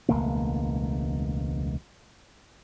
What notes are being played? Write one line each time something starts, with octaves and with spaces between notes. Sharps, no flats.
E1 C#2 A3 A#3